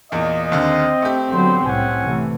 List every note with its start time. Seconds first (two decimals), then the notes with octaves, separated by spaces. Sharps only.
0.12 E2 A#2 D#5
0.52 D#2 D3 C4
1.02 A3 G4
1.31 D3 F#3 B3 C5
1.66 C2 A2 C#4 F#5 G#5
2.03 C3 E3 A3